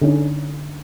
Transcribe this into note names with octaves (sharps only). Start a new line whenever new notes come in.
D3 C#4 D#4